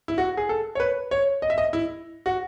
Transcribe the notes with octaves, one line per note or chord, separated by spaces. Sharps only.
E4
F#4
G#4
A4
C#5
B4
C#5
D#5
E5
D#5
E4
F#4